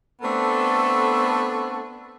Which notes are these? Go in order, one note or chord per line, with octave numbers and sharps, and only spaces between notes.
A3 B3 C4 D4 A4